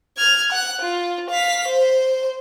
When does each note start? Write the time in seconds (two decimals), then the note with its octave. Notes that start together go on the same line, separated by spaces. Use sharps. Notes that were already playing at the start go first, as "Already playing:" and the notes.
0.17 F6 G#6
0.52 F#5 F#6
0.81 F4
1.30 F5 B6
1.68 C5